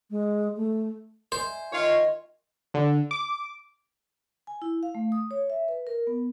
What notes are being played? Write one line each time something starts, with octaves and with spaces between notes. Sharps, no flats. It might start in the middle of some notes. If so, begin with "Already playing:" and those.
G#3
A3
C5 D5 E5 G#5
D#3 F4 F#4 C#5
D3
D6
G#5
E4
F5
A3
D#6
C#5
E5
B4
A#4
B3